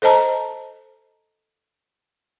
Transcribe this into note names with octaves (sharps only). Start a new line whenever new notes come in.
A4 C5 D#5 A5 A#5